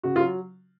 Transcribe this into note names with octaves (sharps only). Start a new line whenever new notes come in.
C#3 F#4
F4
F#3